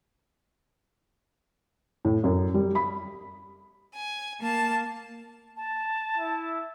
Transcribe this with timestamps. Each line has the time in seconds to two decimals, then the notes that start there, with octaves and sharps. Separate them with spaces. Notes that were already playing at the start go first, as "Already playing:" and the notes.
2.05 A2
2.24 F#2
2.54 G3
2.75 B5
3.96 G#5
4.39 A#3 A5
5.56 A5
6.18 E4